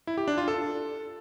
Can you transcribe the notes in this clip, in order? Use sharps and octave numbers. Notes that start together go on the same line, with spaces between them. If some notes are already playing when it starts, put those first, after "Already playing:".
E4
G4
D4
F4
A4